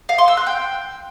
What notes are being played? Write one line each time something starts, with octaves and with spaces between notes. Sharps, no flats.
F5
C6
E6
F#6
G5